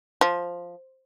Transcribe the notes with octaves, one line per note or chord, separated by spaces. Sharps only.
F3